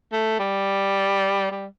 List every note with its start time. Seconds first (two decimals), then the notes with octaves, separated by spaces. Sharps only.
0.12 A3
0.39 G3
1.51 G3